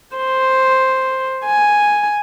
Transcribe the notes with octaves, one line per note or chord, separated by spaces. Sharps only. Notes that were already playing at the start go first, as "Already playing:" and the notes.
C5
G#5